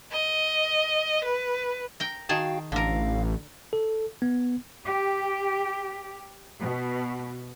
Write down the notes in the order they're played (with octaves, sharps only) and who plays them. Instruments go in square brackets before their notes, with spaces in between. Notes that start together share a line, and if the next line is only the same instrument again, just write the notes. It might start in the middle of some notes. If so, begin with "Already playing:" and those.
[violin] D#5
B4
[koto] A#4 G5
[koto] D#3 G#4 A5 [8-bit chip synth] F#4 F5 G5
[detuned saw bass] A1 [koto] D3 A#4 [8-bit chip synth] F5
[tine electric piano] A4
B3
[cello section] G4
B2